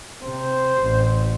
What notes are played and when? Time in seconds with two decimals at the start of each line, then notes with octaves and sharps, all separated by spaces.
0.22 C3 C5
0.81 A1